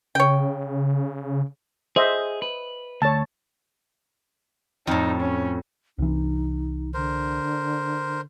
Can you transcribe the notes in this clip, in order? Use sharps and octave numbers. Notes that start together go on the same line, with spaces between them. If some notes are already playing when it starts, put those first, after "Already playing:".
C#3 C#5 G5
G#4 C5 D#5 E5
B4
D2 C#5 A5
F2 A2 D#4
C#4
C2 E3 D#4
D3 A#4 C5